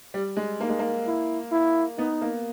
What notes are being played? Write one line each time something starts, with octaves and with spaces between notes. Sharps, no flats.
G3
G#3
A#3 D#4
G#3
A#3
E4
E4
B3 D#4
A#3